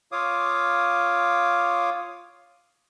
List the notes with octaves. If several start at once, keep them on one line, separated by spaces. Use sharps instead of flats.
F4 C#5 F5 D6 D#6